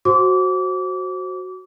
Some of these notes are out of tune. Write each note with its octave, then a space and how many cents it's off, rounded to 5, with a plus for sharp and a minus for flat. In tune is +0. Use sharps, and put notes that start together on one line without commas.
F#4 +0 C5 +15 D6 -30